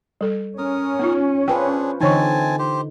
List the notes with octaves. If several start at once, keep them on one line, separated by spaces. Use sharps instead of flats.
G3 A4
C#4 A#4 D#6
B3 D#4 F4
D4 F4 G#4 B4 C5 G5
D3 E3 C4 D#4 C#5 G#5 A5 C#6
G4 C5